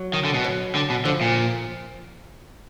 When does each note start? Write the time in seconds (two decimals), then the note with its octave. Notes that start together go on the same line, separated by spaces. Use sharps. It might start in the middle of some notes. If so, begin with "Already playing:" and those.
Already playing: F#3
0.13 D#3
0.25 D3
0.34 B2
0.44 F#3
0.75 D3
0.90 B2
1.05 D3 F3
1.21 A#2